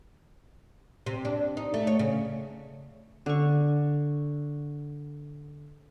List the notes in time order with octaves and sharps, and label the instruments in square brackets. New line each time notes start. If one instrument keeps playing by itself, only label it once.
[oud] C3
D4
D#4
A3
C#5
C#3
[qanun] D3 C#6